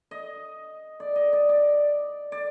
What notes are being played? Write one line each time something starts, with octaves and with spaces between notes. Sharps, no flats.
D#5
D5
D#5
D5
D5
D5